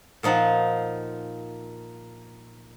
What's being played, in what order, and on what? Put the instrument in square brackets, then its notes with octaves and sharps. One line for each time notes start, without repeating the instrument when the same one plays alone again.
[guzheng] A#2 F3 D#4 F#5 A5